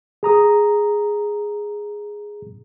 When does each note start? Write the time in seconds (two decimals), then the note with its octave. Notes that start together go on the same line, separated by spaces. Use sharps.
0.23 G#4 A#5 D#6